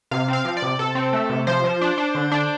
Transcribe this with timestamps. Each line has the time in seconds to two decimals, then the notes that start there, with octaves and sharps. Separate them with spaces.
0.11 C3 F5
0.28 C4 F5
0.45 F3
0.57 D5
0.62 C3
0.79 C3 A4
0.95 C4
1.13 A3
1.30 C3
1.47 F3 C5
1.64 F3
1.81 D4
1.98 D4
2.15 D3
2.32 D4